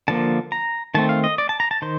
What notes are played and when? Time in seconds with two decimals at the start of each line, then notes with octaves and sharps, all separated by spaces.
0.08 D3 F3 A#3 A5
0.52 A#5
0.94 D#3 A3 C4 A5
1.09 F5
1.24 D#5
1.38 D5
1.49 A5
1.60 A#5
1.71 A5
1.82 D#3 C5